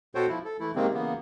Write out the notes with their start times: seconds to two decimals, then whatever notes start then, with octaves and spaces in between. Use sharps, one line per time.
0.15 B2 F#4 A4 C5 C#5 G5
0.29 F3 E4
0.45 A4
0.60 E3 A3 E4
0.76 C3 D#3 G#3 A#3 C4
0.94 C#3 E3 A#3 B3